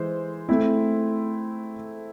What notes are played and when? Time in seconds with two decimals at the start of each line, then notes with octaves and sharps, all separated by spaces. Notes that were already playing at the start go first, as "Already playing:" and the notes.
Already playing: E3 G#3 C5
0.49 A3 C4 E4